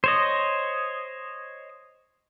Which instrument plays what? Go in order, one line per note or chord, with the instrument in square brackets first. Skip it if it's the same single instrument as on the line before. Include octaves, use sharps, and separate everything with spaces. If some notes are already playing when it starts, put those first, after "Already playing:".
[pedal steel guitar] C5 C#5 D#5